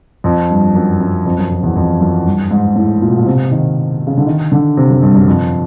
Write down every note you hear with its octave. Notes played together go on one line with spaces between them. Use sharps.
F2
G2
F#2
F#2
F2
F#2
F2
E2
F2
F#2
G2
G#2
A2
A#2
B2
A#2
C3
D#3
C#3
D3
D#3
D3
C3
F#2
G2
F#2
F2